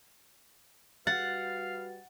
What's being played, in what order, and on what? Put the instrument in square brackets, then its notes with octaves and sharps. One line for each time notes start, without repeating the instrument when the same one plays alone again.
[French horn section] G3 F#4 B4 [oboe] F5 [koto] F#5 [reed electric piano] A6